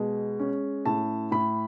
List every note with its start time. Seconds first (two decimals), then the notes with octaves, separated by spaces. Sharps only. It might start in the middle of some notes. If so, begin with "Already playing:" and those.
Already playing: B2 G#3
0.40 C#4
0.86 A2 A5
1.31 A2 B5